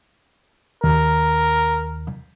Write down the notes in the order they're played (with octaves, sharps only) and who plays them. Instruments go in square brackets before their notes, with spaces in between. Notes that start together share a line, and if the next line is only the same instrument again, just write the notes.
[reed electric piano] D#2 [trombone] A#4